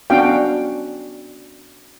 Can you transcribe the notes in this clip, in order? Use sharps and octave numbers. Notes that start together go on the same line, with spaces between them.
B3 C#4 D4 F#4 F5 G5